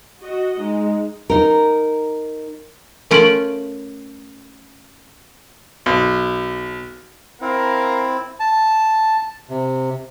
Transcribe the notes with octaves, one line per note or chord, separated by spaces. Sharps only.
F#4 D#5
G#3 D#4
D#4 A#4
A3 C#4 F4 A#4 D7 F#7
B1
C4 E4 A#4 F5 A#5
A5
C3